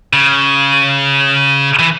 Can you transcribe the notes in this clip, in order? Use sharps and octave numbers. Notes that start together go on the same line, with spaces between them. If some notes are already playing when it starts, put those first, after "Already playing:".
C#3
E3